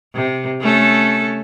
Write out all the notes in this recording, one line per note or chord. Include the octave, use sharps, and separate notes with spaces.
C3
A3 C#4 A4